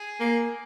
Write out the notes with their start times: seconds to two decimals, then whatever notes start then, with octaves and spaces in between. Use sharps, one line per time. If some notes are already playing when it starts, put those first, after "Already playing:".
Already playing: G#4
0.20 A#3